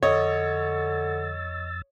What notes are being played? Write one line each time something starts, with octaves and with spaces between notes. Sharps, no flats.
F2 D3 C#5 D#5 E6 A6